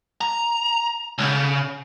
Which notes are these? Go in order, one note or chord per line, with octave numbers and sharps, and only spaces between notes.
A#5
C#2 C#3